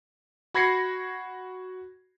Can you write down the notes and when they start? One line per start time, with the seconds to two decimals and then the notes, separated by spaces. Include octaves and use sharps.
0.54 F#4 B5 G#6 A#6 C7 C#7